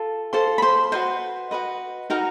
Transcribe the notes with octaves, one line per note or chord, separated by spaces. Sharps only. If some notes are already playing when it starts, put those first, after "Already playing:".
Already playing: F4 A4
F4 A4 C5 C6
B5
C5 C6
F#4 B4 C5 D#5 C6
F#4 B4 D#5
D#4 F#4 A#4 D#5 A#5